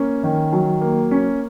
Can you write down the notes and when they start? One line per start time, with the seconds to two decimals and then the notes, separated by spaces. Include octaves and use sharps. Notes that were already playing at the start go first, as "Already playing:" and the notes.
Already playing: A#3 C#4
0.23 D#3
0.52 F#3
0.81 A#3
1.11 C#4